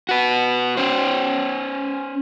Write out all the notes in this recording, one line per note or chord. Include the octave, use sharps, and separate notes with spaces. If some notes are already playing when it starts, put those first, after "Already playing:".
F#4 B4
C#4 C5